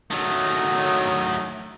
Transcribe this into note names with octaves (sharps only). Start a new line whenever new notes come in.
D#3 F#3 A3